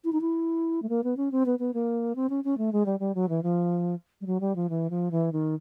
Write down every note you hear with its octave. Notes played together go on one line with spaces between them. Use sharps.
E4
D#4
E4
A3
A#3
B3
C#4
C4
B3
B3
A#3
C4
C#4
C#4
A3
G#3
G3
G3
F#3
E3
F3
G3
F#3
G3
F3
E3
F3
E3
D#3